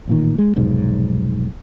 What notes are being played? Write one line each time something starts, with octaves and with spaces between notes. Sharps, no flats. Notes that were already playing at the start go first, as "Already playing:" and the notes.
A1 A#2 D#3
G#3
F1 B1 G#2